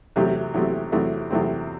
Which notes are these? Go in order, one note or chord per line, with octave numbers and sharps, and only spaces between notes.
E2 C3 F#3 A3 C4
E2 C3 F#3 A3 C4
E2 C3 F#3 A3 C4
E2 C3 F#3 A3 C4